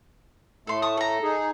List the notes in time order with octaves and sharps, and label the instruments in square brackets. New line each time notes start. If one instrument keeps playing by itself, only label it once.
[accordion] A2 A3 [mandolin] A4 C6
[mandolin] A5 C#6 D#6
A4 A#5
[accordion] D#4 G#4